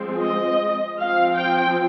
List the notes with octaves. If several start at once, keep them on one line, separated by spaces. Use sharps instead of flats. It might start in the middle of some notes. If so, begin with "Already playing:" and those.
Already playing: F3 G#3 C4
D#5
F3 C4 F5
G5